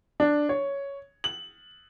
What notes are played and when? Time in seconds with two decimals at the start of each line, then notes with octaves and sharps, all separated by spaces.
0.20 D4
0.49 C#5
1.24 F#7